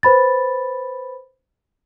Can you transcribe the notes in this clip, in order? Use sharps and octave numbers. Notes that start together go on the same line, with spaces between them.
B4 C5 B5 A6